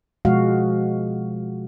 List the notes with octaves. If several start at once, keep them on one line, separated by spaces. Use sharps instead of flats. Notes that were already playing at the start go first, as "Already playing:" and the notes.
B2 F3 G#3 F#4 F5